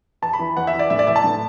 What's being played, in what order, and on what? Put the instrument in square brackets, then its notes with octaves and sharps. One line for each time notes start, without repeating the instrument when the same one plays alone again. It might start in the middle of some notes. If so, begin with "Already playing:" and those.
[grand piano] E2 A5
B5
E3
E2 F#5
E5
E3
D5
A2 E5
D5
E3 E5
A5
A2